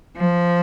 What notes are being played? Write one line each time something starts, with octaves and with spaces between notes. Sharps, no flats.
F3